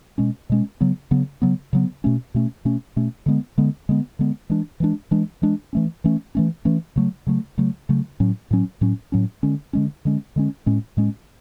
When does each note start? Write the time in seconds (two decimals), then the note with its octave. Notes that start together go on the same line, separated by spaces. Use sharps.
0.18 B2 G#3 C#4
0.50 B2 G#3 C#4
0.81 C#3 F#3 B3
1.11 C#3 F#3 B3
1.42 C#3 F#3 B3
1.73 C#3 F#3 B3
2.04 B2 A3 C#4
2.34 B2 A3 C#4
2.65 B2 A3 C#4
2.96 B2 A3 C#4
3.26 D3 G#3 B3
3.58 D3 G#3 B3
3.89 D3 G#3 B3
4.19 D3 G#3 B3
4.50 E3 G#3 D4
4.80 E3 G#3 D4
5.11 E3 G#3 D4
5.42 E3 G#3 D4
5.73 E3 A3 C#4
6.04 E3 A3 C#4
6.35 E3 A3 C#4
6.65 E3 A3 C#4
6.96 C#3 F#3 A3
7.27 C#3 F#3 A3
7.58 C#3 F#3 A3
7.89 C#3 F#3 A3
8.20 A2 F#3 C#4
8.51 A2 F#3 C#4
8.81 A2 F#3 C#4
9.12 A2 F#3 C#4
9.43 D3 G#3 C#4
9.73 D3 G#3 C#4
10.05 D3 G#3 C#4
10.36 D3 G#3 C#4
10.66 A2 G#3 C#4
10.97 A2 G#3 C#4